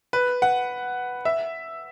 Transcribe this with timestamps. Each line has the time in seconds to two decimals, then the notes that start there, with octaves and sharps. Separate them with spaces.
0.13 B4
0.42 F#5
1.25 E5